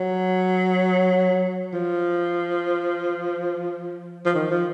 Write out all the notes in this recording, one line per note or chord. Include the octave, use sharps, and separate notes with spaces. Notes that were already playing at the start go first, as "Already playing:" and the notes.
Already playing: F#3
F3
F3
D#3
F3